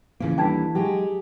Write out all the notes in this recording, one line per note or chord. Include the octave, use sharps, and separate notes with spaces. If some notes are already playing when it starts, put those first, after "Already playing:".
C#3 E3 F3 A#3
D#2 G3 D4 A4 B4 G5 A5 G#6
F#3 G#3 D#4 G4 G#4